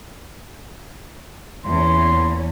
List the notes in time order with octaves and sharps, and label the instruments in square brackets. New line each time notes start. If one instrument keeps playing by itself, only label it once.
[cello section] E2 A#2 C#4 [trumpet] C6